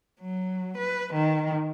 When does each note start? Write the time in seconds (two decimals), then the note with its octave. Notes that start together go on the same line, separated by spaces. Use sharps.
0.21 F#3
0.78 B4
1.14 D#3